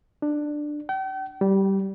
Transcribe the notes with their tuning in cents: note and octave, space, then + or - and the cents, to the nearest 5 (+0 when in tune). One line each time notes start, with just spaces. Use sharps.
D4 +10
G5 -40
G3 -15